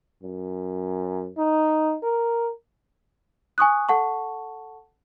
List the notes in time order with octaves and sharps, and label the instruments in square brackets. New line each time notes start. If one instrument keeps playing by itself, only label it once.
[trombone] F#2
D#4
A#4
[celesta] G#5 C#6 D#6 F#6
A4 F#5 A5 C#6